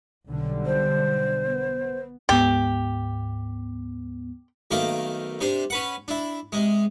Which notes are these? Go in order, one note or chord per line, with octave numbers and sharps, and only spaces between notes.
B1 D3 G3
C5
B3
D2 G#2 B3 G4
B1 D#3 A3 A#3 G5 D6
C3 D4 C5
C#4 B4 F#5
D4 E4
C3 G#3